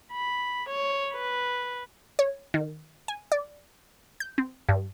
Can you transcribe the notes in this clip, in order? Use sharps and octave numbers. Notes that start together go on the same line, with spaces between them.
B5
C#5
B4
C#5
D#3
G#5
D5
G6
C4
G2